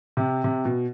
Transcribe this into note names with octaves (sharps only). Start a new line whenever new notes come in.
C3
C3
B2